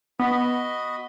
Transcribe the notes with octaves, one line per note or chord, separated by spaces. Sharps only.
B3 F#4 D#5 B5